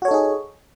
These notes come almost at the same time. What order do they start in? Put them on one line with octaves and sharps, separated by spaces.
F#4 C#5 A4 D#4 G#4